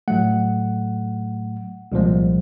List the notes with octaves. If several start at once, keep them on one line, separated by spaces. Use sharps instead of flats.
A2 F#3 A3 F#5
C2 A#2 F3 G#3